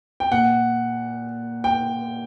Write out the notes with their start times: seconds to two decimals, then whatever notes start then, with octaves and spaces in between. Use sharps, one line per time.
0.20 G5
0.31 A#2 F#5
1.64 G5